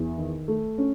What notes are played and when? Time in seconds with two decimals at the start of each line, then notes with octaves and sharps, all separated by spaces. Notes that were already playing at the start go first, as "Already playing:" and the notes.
Already playing: E2
0.18 D#3
0.48 A3
0.78 C#4